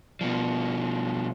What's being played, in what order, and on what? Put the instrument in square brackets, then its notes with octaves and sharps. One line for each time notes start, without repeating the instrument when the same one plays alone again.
[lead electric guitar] B2 F3